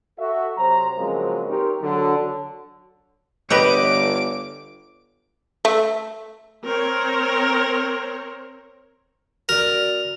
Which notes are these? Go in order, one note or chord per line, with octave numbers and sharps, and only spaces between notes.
F#4 A4 E5
C3 F#3 C5 A#5
C#3 F3 F#3 G#3 A#3 C4
C4 D#4 G4 A#4 C#5
D3 F#3
G1 G4 B4 C#5 D#5 D6 D7
A3
C4 A#4 C#5
F#3 B3 F#4 A#4 D5 F7